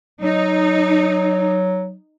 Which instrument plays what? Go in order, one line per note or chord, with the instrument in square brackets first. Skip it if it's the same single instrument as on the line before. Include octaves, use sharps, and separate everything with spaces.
[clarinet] F#3 [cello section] D#4